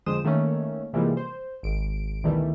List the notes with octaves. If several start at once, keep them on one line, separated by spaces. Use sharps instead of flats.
F2 D3 G#3 C5 D#6 E7
D#3 A3 A#3 C#4
C3 E3 F3 G3 G#3 A#3
C5
G#1 D7
D2 B2 D#3 E3 G3 A3